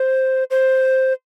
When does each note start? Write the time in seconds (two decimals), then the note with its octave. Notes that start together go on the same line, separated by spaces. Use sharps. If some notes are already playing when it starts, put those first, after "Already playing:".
Already playing: C5
0.51 C5